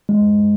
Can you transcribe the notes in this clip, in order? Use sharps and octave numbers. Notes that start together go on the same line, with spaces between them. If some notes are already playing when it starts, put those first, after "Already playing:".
G#3